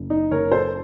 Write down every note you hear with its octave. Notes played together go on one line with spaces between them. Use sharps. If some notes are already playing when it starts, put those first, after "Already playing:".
Already playing: F#1
D#4
F#1 A#4 C#5
A4 C5